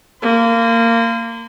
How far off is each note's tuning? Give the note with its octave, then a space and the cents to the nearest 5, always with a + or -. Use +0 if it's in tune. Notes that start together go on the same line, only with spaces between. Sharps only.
A#3 -20 C6 -45